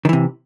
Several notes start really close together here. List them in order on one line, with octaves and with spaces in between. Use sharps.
D#3 E3 C3